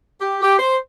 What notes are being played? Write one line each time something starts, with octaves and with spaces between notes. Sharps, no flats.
G4
G4
C5